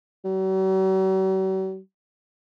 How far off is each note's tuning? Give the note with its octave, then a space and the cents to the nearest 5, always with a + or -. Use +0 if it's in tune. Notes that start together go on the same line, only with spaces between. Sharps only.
F#3 +45